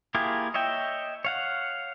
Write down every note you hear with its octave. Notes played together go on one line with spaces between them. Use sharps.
A#3 E4 F4 G4 G#4
C#5 D#5 E5 G5
C#5 F5 F#5